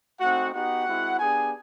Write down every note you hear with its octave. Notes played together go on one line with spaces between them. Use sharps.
A3 C4 D#4 F#4 F#5
B3 D#4 F#4 G4 F#5
G#3 C4 E4
B3 D4 G4 G#4 G#5